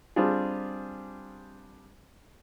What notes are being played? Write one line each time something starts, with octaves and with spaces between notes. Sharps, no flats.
G3 C4 D4 F4 G4 G#4